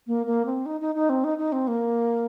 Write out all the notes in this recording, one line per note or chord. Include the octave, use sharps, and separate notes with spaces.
A#3
A#3
C4
D#4
D#4
D#4
C4
D#4
D#4
C4
A#3